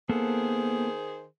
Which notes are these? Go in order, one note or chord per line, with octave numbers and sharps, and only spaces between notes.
D#3 A#3 B3 G#4 A4 C5